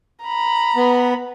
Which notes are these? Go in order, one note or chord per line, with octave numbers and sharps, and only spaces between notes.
A#5 B5
B3